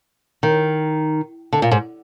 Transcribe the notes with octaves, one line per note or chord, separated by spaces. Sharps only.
D#3
D3
A#2
G#2